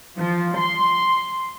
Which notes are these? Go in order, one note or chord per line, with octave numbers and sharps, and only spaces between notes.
F3
C6